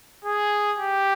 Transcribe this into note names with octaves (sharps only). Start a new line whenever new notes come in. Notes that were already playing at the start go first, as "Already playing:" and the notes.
G#4
G4